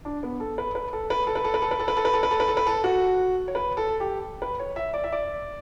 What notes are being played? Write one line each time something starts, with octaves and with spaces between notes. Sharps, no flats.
D4
B3
A4
B4
B4
A4
B4
A4
B4
A4
B4
A4
B4
A4
B4
A4
B4
A4
B4
A4
B4
A4
B4
A4
F#4
C#5
B4
A4
G4
B4
C#5
E5
D5
E5
D5